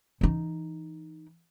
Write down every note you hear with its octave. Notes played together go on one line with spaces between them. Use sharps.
E3 D#4